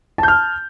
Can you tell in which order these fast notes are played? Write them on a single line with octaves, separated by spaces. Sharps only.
A5 G6 F6